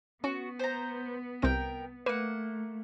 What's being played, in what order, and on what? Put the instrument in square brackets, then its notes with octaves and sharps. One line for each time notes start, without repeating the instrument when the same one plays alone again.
[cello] B3 [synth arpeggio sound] C#4 [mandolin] F#4
[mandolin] C5 A#5
[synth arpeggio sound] C2 C4 D7 [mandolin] A#4 G5
[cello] A3 [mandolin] A#3 F#5 [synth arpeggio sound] B4 D#7